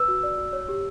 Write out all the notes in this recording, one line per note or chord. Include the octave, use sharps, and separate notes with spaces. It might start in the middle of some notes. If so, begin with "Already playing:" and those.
Already playing: B4 E6
F#4
D5
F#4
C#5
G4